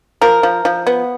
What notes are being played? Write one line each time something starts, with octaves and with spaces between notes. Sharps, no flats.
F3 A#4
F3
F3
B3